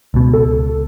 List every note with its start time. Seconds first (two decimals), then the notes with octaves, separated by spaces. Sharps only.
0.14 C#2 B2
0.33 A4